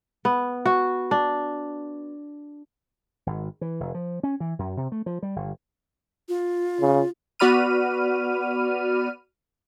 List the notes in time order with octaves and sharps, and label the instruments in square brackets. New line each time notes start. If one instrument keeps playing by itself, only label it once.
[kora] B3
F#4
D4
[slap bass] G#1
E3
F1
F3
C#4
E3
F#2
C3
A3
F3
G3
G1
[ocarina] F4
[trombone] C#3
[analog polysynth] B3 F#4 D5 B5 F6 D#7